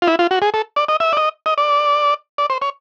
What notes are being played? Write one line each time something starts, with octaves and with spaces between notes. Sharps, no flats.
F4
E4
F4
F#4
G#4
A4
D5
D#5
E5
D5
D#5
D#5
D5
D5
C5
C#5